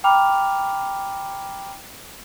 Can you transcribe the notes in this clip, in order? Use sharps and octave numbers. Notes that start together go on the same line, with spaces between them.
G5 A#5 B5 D6 F6 F7